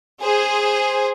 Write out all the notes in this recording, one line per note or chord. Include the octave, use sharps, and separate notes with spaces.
G#4 C5